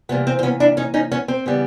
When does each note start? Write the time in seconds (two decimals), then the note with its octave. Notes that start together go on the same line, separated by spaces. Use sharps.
0.09 C3 E3 G3 A#3 B3
0.27 C4
0.39 C4
0.43 B3 C#4
0.60 D4 E4
0.77 C#4 D#4
0.94 C#4 D#4
1.12 B3 C#4
1.28 C4
1.46 C#3 E3 G3 B3